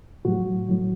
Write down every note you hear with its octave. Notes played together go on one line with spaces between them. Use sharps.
A2 F#3 F#4
A2 F#3